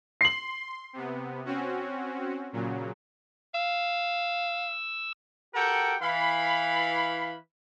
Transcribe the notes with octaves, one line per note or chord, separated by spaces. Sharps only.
C6 C7 F#7
C3 B3
C4 C#4 F#4
A#2 C#3 F#3
F5 E6
F#4 G4 A4 A#4 F#5 G5
E3 F5 B5